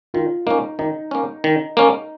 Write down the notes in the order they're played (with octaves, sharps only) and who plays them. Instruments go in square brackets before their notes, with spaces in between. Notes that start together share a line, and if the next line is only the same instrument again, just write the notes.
[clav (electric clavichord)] D#3 [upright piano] F4
[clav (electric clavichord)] A#3 C#4 [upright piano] D#4
[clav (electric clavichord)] D#3 [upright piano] D#4
[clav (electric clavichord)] A#3 C#4
D#3
A#3 C#4